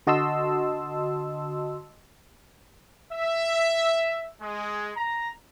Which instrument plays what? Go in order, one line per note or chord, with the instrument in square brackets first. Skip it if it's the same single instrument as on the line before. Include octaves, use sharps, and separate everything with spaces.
[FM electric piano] D3 F#4 D#5 A5 C6 E6
[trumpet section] E5
G#3
A#5